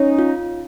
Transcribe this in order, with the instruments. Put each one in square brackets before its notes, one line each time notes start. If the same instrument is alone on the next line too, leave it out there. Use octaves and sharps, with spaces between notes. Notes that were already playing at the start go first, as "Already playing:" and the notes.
Already playing: [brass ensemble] C#4 D#4 [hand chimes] C#5
[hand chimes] F4